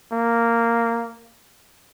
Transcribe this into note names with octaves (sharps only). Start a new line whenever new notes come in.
A#3